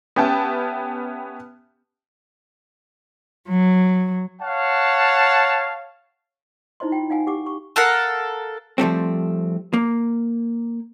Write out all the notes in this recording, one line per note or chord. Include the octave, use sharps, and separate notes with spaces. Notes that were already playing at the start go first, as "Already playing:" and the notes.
B3 C#4 G4 E5 G5 A5
F#3
C#5 F5 F#5 A5
D#4 E4 C5 D#5 C6
F4 G5
D#4 F5 F#5 G#5
G4 F#5 D6
C#6
A4 A#4 F5 F#5
F3 G3 A3 C4
A#3